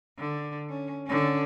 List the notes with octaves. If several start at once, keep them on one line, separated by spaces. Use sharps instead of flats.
D3
C#4
D3 C#4